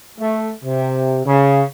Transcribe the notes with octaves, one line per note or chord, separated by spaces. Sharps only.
A3
C3
C#3